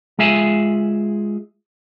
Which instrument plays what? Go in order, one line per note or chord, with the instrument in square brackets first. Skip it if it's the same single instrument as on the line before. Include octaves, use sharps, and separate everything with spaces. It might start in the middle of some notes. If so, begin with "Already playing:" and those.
[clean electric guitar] G#3 F4 G#4 E5 G#5